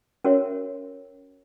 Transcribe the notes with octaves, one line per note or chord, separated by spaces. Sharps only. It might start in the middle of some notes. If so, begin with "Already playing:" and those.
C#4 F#4 A#4 C#5 E5